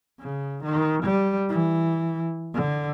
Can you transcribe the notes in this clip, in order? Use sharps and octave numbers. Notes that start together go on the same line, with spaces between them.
C#3
D#3
G3
E3
D3